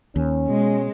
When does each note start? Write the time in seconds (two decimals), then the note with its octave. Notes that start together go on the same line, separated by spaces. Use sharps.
0.16 D#2 C#4
0.49 B2 G#3